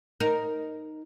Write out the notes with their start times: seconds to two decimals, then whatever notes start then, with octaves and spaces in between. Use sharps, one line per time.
0.20 D#4 A#4